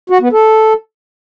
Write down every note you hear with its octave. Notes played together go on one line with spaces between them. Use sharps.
F#4
B3
A4